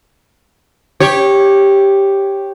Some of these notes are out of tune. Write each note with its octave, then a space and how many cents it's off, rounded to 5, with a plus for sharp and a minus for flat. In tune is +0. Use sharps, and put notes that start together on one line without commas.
G4 +0 C#5 -15